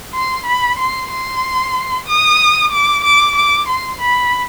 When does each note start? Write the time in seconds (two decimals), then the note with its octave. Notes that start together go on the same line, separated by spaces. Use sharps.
0.14 C6
0.46 B5
0.79 C6
1.11 C6
2.07 D#6
2.72 D6
3.04 D6
3.36 D6
3.69 C6
4.01 B5